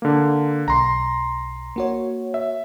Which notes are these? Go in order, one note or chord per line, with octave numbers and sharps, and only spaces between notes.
D3 A#3
B1 A#5 C6
A#3 F#4 C#5
E5